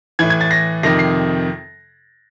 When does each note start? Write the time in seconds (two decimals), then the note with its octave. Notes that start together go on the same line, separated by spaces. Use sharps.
0.19 A2 E3 G#6
0.30 G#6
0.41 A6
0.51 A#6
0.83 F2 C3 D#3 A#6
0.99 C7